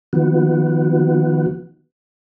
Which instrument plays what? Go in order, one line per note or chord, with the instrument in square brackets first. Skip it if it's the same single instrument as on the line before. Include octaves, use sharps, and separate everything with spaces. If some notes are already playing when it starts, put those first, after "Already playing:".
[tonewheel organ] D#3 F3 B3 F#4